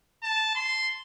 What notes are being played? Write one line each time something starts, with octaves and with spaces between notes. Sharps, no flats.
A5
C6